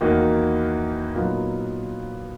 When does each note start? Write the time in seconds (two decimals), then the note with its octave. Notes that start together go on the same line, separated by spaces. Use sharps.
0.01 E2 D#3 A#3 D#4 F#4
1.14 A#2 F#3 B3 D#4